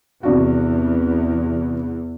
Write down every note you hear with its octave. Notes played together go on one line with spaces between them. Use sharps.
E2 C3 D4 F#4